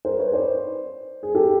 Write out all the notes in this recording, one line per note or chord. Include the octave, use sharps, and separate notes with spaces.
A#4 C5
B4 C#5
C5 D5
G#4
G4 A4